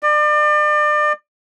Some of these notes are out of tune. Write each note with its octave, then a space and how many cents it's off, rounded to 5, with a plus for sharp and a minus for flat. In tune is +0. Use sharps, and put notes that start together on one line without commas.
D5 +35